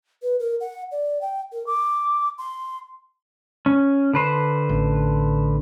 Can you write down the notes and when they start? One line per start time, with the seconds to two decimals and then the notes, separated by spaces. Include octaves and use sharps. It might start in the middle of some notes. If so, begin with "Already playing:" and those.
0.22 B4
0.40 A#4
0.61 F#5
0.91 D5
1.21 G5
1.52 A#4
1.67 D6
2.38 C6
3.66 C#4
4.13 D3 B4 C5
4.69 A1